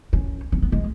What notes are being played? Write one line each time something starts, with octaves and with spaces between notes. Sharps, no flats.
C#4
C#4
B3
G#3